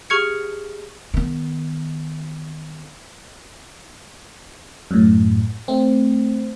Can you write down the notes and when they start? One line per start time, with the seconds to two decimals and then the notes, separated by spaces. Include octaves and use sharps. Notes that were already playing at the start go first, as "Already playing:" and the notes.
0.10 G4 G#4 C#6 F6 G#6 C#7
1.14 D#3 B3
4.91 F#2 A2
5.68 A3 C4